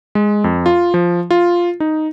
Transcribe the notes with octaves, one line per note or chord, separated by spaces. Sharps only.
G#3
F2
F4
F3
F4
D#4